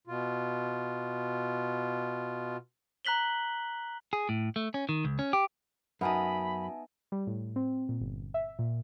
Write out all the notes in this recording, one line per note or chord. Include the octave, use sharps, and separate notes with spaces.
B2 F4
A#5 F#6 B6 F#7 G7
G#4
A2
A3
C#4
D#3
C#2
C#4
G4
F#2 B3 D#4 E5 G#5 A5 B5
G3
A2
C4
A#2
G1
E5
A#2